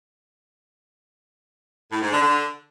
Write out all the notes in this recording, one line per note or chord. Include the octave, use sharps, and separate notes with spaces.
A2
G#2
D3
D3